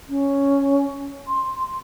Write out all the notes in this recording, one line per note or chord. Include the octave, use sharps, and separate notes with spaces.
C#4
C6